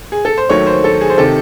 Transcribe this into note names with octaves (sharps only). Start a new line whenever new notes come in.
G#4
A4
C5
D#2 D#3 F#3 A3 C#5
C5
A4
G#4
C5
C3 D#3 A4